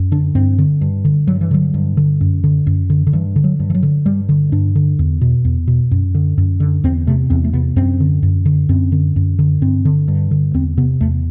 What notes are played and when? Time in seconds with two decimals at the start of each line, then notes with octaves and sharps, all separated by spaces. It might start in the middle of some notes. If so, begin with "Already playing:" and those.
Already playing: F#2
0.12 D3 D4
0.35 G2 C4
0.59 D3
0.81 G2
1.05 D3
1.27 G2 F#3
1.41 E3
1.51 D3 F#3
1.74 G2
1.97 D3
2.21 F#2
2.44 D3
2.67 F#2
2.90 D3
3.07 D3
3.13 G2 E3
3.36 D3
3.44 F#3
3.60 G2
3.70 E3
3.75 F#3
3.83 D3
4.05 G2 G3
4.29 D3
4.52 G2 D4
4.75 D3
4.99 E2
5.21 B2
5.45 E2
5.67 B2
5.91 F#2
6.15 D3
6.38 F#2
6.60 D3
6.84 E2 C4
7.07 C3 A3
7.30 E2 C4
7.44 A3
7.53 C3 B3
7.76 F#2 C4
8.00 D3
8.23 F#2
8.45 D3
8.69 F#2 C4
8.92 D3
9.16 F#2
9.39 D3
9.62 G2 C4
9.85 D3
10.08 G2
10.31 D3
10.54 E2 C4
10.77 C3 B3
11.01 E2 A3